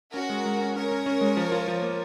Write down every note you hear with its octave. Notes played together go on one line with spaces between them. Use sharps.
C#4 F#4 A#4
G#3
G#3
C#4
C#4 A#4 C#5
C#4
C#4
G#3
F3
F4
F3
A#3